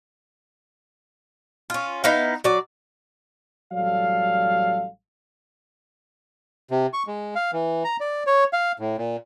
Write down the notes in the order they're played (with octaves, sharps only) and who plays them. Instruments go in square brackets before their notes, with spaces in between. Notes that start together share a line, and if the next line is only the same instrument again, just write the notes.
[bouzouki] C#4 F4
B3 D#4 E4 F5
F#3 D5
[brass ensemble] A1 F#3 G3 A4 D5 F5
[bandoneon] C3
C#6
G#3
F5
E3
A#5
D5
C#5
F5
A2
A#2